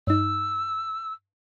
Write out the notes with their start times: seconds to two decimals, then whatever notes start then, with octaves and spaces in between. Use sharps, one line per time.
0.07 G2 D#4 E6